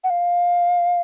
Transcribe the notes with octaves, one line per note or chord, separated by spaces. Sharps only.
F#5
F5